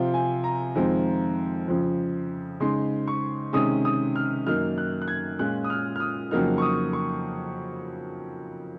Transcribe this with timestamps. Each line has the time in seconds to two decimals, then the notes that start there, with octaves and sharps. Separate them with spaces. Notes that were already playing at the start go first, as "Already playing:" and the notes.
Already playing: C3 F3 C4 F4
0.14 G#5
0.44 A#5
0.75 F2 D#3 G#3 C4 F4
1.68 F2 C#3 F3
2.60 C#3 G#3 D#4 C6
3.08 C#6
3.53 C3 D#3 G#3 C#4 D#6
3.85 D#6
4.16 F6
4.46 F#2 D#3 A#3 D#4 F6
4.78 F#6
5.02 F#6
5.08 G#6
5.39 A#2 G#3 C#4 F4 F#6
5.64 D#6
5.70 F6
5.96 F6
6.00 D#6
6.31 F2 C#3 F#3 A#3 D#4 F6
6.58 C#6
6.62 D#6
6.93 C#6